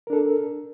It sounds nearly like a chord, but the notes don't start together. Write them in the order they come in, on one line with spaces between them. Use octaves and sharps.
A#4 D4 A4